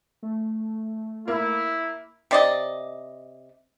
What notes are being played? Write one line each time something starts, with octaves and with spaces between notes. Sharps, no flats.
A3
A#3 E4
C3 D5 D#5